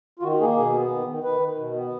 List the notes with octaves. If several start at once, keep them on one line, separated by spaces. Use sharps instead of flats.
F4
D#3 F#4
A#3 G#4
B2 G#4
B3
D#3
D#3
D#3 B4
D#3
B2
B3